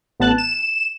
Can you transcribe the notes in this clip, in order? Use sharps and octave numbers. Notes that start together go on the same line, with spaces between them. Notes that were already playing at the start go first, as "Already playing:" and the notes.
A1 B3 A5 F#6
E7